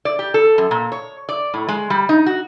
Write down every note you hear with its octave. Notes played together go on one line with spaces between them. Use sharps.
D5
G4
A4
F#2
A#2
C#5
D5
A2
G#3
G3
D#4
F#4